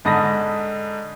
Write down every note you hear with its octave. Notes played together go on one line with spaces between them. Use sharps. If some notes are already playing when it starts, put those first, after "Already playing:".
G#2 D3 A5 B5 D#6 A#6